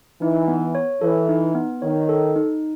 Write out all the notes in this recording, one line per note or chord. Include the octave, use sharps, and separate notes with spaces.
E3 D#4
B3
C#5
E3 A4
D#4
B3
D#3 C#5
A4
D#4